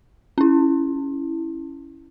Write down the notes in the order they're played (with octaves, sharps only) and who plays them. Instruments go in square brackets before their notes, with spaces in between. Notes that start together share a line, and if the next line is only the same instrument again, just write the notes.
[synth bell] C#4 E4